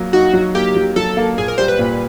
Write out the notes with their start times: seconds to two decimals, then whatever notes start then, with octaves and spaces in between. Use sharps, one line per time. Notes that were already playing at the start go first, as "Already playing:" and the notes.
Already playing: F#3 A#3
0.13 D#4 F#4
0.34 F#3
0.55 A#3 G4
0.75 F#3
0.96 F#3 A4
1.17 A#3
1.37 A#2 G#4
1.48 A#4
1.58 G3 C5
1.68 B4
1.79 A#2